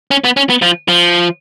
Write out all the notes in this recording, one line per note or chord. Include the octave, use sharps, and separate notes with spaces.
C#4
B3
C#4
B3
F3
F3